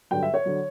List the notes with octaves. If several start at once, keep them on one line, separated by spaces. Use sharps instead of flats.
G2 D3 F#3 G5
E5
C#5
D3 F#3